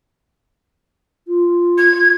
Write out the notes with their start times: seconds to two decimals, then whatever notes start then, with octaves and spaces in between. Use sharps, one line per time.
1.28 F4
1.78 G#6